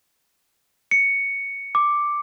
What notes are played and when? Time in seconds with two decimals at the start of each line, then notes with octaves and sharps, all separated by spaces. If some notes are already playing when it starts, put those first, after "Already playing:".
0.91 C#7
1.75 D6